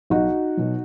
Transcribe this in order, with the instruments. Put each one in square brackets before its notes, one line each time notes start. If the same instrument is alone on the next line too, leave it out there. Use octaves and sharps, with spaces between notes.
[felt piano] B1 D#4 F#4
B2 F#3